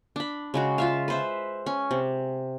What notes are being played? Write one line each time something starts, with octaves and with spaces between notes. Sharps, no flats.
D4 B5
C#3 G#3 F#4
F4 E5 F5
B4 C5 E5
C#4
C3